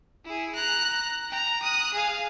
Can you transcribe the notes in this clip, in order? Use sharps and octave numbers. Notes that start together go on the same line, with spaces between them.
E4 G#4
A#5 F#6
G5 A#5
D#6 F#6
G#4 F5